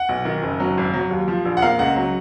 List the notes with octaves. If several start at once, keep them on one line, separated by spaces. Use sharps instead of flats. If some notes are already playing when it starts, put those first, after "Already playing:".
Already playing: F#5
B1
D#3
F#1
F#3
G#1
F#3
D#2
F3
A#1
F#5
A#3 F5
C#2 F#5
F#3